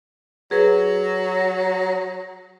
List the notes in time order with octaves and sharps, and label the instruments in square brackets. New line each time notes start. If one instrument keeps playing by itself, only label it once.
[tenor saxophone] F#3 [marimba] G#4 B4